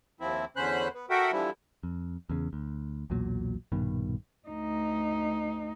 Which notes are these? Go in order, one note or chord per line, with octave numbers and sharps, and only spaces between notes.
D#2 F3 C4 E4
E2 D3 C#4 C5 B5 F#6
B3
F#4 A4 A#4 E5 F#5 G5
D3 E3 F3 G3 E4
F2
E2 C#3
D2
B1 E2 A#2 F#3
A#1 G2 B2 D#3
D2 D#4